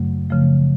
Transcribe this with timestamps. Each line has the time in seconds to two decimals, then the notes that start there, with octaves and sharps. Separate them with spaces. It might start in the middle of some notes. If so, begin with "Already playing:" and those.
Already playing: F#2 C#3 F#3 A3
0.30 C#3 F3 A3